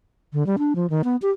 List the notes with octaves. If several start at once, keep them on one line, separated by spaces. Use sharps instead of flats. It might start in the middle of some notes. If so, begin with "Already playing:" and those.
D3
G3
D4
F3
D#3
B3
G4